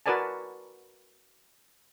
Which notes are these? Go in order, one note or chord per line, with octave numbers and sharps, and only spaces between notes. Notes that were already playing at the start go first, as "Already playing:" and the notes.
F#4 A#4 B4 D5 G#5 A5